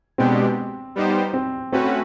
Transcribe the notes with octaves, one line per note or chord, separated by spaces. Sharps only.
B2 G#3 B3 C4 D4 G4
G3 B3 D#4 G4 C5
C4
A3 C4 C#4 F#4 B4